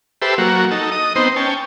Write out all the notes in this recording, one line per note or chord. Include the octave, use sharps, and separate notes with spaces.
G4 A4 B4 C5 E5
F#3 A#3 F#4
D#4 A4
D#5 D#6
B3 C4 D#4 C5
C#4 G5 A5